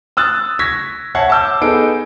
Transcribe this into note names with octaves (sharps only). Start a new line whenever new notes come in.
D#6 E6 F#6 A6
C#6 G#6 A#6 B6
C#5 E5 F#5 A5 G#6 C7
A5 D6 E6 G6
B3 D#4 G#4 A4 D7